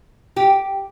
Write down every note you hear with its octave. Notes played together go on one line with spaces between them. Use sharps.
G4